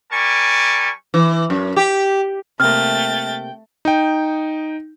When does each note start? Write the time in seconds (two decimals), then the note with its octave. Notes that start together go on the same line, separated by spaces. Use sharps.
0.11 G3 A#4 G#5 A5 C#6
1.14 E3
1.50 F#2
1.76 G4
2.60 C3 A3 A#3 G5 F6 A6
3.85 D#4 G5